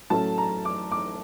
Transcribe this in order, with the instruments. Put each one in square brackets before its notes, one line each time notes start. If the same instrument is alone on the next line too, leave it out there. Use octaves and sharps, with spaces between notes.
[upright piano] A2 F#3 A3 C#4 A5
A#5
D6
D6